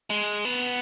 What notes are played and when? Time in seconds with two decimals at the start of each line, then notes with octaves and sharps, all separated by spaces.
0.10 G#3
0.45 B3